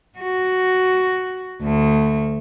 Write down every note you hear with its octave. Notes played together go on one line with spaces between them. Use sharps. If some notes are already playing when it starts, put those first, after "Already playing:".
F#4
D2 A3